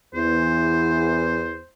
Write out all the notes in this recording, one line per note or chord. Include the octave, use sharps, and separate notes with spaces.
E2 C5